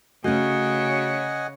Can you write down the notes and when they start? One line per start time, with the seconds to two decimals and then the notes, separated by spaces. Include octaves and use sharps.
0.24 C#3 A3 C#4 F#4 C#5 D#5 F#5 G#5